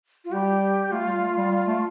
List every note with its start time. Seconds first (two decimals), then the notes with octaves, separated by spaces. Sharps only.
0.25 F4
0.32 G3 G4
0.92 A3 F4
1.06 G3
1.21 A3
1.36 G3
1.51 G3
1.66 A3